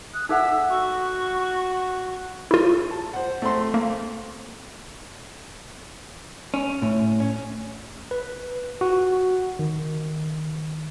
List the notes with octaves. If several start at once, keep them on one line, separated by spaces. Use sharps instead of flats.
D#6 F#6
D#4 A4 E5 F#5 E6
F#4 C#6
E4 F4
A5
C5 F#5
A3 C4 C6
A#3
C#4
A2
C#4
B4
F#4
D#3